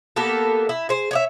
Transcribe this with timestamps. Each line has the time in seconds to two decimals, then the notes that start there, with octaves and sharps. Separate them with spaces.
0.16 A#3 B3 G4 A4
0.69 E4
0.89 G#4 C5
1.11 C#5 D5 E5